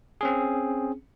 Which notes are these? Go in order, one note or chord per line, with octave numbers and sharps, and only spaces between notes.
C4 C#4 G#4